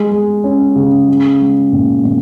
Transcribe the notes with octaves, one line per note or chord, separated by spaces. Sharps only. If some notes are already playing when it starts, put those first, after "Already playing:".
Already playing: G#3
G#3
C#4
C#3
G#3
G#3
A#2
A#2